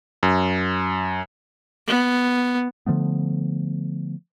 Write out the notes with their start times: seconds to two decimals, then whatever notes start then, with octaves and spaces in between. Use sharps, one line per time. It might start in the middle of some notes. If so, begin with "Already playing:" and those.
0.23 F#2
1.87 B3
2.86 D3 F3 A3 B3